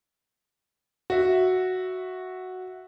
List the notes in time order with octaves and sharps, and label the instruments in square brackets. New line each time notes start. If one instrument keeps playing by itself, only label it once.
[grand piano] F#4 E5